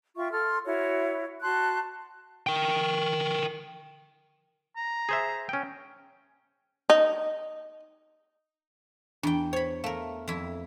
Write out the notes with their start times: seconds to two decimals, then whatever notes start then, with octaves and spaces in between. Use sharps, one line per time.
0.17 F4 E5 G5 C#6
0.32 A4 C6 F6
0.64 E4 F#4 C#5
1.42 F#4 A5 C6 F#6
2.47 A#4 G5
4.77 A#5
5.09 G#4 C5 E5
5.49 C#4 G5
6.90 D#4
9.23 E2 D4 G5
9.53 C5 C#5 B5
9.84 A3 A#4 F5
10.28 F2 E4